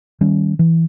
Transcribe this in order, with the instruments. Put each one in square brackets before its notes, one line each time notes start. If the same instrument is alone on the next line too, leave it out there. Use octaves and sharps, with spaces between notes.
[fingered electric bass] D#3 G3 C#4
E3